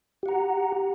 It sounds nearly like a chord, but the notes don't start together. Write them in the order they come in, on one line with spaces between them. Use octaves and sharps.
G4 F#5 A#5